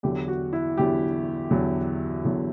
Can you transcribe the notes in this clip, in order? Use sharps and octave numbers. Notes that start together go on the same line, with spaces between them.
E2 D3 F#3 G4
F#4
E4
E2 D3 F#3 G4
E2 D3 F#3
E2 D3 F#3